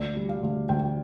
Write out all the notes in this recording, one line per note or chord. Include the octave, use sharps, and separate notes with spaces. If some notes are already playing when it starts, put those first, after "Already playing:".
Already playing: D2 D5
G3
F5
D2
D2 G5